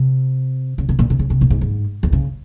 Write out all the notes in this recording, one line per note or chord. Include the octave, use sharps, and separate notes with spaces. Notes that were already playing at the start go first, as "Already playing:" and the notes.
Already playing: C3
C#3
C3
A#2
C3
C#3
C3
A#2
G#2
G#2
E2
C#3